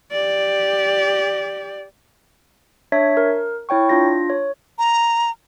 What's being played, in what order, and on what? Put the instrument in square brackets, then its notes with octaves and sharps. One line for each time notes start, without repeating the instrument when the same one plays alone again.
[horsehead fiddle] G4 D5
[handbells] D4 C#5 E5 G#6 B6
A#4
E4 C#5 G5 C#6
D4 F4 A#6
C#5
[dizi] A#5